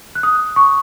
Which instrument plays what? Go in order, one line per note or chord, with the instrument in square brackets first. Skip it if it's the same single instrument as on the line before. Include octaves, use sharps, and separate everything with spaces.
[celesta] F#6
D#6
C#6